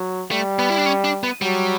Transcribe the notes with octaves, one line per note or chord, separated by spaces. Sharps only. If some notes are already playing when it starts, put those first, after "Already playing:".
Already playing: F#3
G3 A3
B3
E4
D4
C#4
D4
B3
F#3 G3